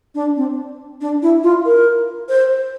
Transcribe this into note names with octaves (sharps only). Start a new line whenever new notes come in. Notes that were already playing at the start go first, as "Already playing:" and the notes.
D4
C4
D4
E4
F4
A#4
C5